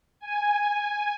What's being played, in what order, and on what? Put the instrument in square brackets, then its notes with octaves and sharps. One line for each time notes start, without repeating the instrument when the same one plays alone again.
[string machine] G#5